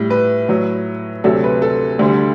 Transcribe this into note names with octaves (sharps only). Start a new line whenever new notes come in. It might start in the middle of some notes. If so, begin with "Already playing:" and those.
Already playing: A2 G3
B4
A2 F#3
D2 C3 F#3 A4
B4
A4
D2 D3 G3